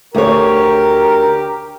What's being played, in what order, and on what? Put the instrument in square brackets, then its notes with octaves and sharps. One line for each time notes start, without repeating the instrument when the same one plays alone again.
[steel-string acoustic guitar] D2 C#5 [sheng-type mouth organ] G4 [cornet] A#4